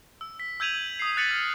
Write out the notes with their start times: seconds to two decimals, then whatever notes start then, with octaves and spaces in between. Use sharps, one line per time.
0.21 E6
0.40 B6
0.60 E6 G6 G#6 D#7 F7 F#7
0.99 D#6 C7
1.17 F#6 A6 B6 C#7 D#7 F#7
1.31 F6